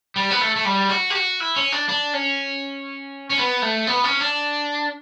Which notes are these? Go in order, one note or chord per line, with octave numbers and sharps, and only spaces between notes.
G3
B3
A3
A3
G3
F#4
G4
F#4
E4
C#4
D4
D4
C#4
C#4
B3
A3
B3
C#4
D4